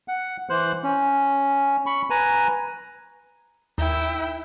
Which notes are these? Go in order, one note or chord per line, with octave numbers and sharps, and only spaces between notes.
F#5
E3 C5 F#6
C#4
B5 C#6
B4 G#5 A#5
D#2 E4 G5